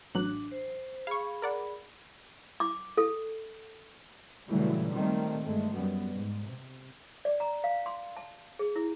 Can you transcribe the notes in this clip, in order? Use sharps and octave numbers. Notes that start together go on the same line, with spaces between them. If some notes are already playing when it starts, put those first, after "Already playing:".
A1 F#3 D4 F#6
C5
G#4 F5 B5 C#6
A#4 D5 F#5
D6
A4
A#2 C#3 E3 F#3 G3 A3
A#2 D#3 G3 A3 C4
G1 G#3 A3
F#2 G3 B3
G#2
C3
D5
A#5
F5
C6
A5
G#4
E4